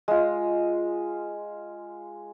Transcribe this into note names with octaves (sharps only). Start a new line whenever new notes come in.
G#3 F4